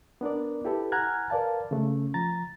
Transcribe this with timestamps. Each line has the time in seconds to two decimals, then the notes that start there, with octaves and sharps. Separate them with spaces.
0.21 B3 D4 A#4 D5
0.65 E4 G4 A4 B4
0.92 F#5 G#5 A#5 F6 F#6 G#6
1.30 A#4 B4 D5 F5 A5
1.71 C#3 A3 C#4
2.14 F3 A#5 A6